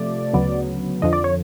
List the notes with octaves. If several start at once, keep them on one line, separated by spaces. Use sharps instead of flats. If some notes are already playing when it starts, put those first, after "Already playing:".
Already playing: C3 F3 A3 D5
D2 C#3 F#3 B3
F2 D3 F3 D#5
D5
C#5